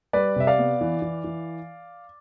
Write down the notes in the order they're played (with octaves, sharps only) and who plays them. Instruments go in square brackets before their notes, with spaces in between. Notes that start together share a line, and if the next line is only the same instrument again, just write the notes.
[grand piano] G3 B4 D5
C3 E5
D5 F5
B3
E3
E3
E3